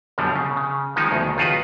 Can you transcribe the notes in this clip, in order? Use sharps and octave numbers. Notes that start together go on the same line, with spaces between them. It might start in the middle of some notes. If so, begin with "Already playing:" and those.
F#2 B2 D3 F3 G3
C#3
C#3
D#3 F3 G#3 D#4
D2 B2 D#3
C#2 D#3 F4 F#4 B4